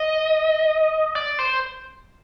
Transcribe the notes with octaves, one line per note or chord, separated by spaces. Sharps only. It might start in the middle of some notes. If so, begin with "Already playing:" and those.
Already playing: D#5
D5
C5